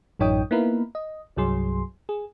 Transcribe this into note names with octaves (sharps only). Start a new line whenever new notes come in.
A1 F#2 D#4 C#5 G5 D#6
A#3 B3 D#4 E4 A#4 B4
D#5
C2 G2 F#3 G#4 C6
G#4